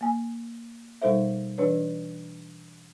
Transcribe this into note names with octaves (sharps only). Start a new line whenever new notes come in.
A#3 G#5
B2 G3 D#4 A4 C5 E5
E3 D4 B4 C#5